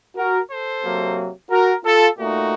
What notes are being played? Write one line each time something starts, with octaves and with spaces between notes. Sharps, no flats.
F#4 A#4
A4 C5
C3 F#3 A#3
F#4 A#4
F4 A4
A#2 A3 D#4 F#4